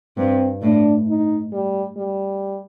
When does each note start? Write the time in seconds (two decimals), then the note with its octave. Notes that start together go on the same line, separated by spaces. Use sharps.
0.17 G2 C4
0.62 A2 D4
1.08 D#4
1.53 G3
1.97 G3